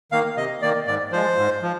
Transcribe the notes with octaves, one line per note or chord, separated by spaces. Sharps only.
D#3 A#3 F5
C3 D#5
D#3 A#3 D5
G#2 D5
F3 G#3 C5
G#2
F3